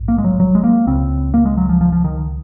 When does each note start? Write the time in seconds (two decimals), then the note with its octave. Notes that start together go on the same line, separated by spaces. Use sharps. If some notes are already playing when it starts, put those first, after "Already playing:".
Already playing: A#1 G#2
0.08 A#3
0.18 G#3
0.24 F#3
0.40 F#3
0.55 G#3
0.64 A#3
0.87 C#2 C#3 C4
1.34 A#3
1.46 G#3
1.57 F#3
1.69 F3
1.81 F3
1.92 F3
2.04 D#3